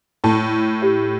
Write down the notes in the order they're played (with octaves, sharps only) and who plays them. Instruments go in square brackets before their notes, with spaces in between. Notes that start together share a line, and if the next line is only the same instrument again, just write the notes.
[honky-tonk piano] A2 [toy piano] A4 D5 A5 C#6
[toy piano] G4 C#5 E5